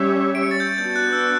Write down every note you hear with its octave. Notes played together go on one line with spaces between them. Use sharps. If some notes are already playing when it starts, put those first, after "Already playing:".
Already playing: G3 C#4 G4 C#5 E5
D7
C#7
A6
G6
A6
B3 D4 F#4 G6
F#6
E6